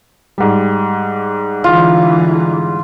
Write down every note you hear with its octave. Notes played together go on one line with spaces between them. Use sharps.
G#2 G3
D3 E3 F4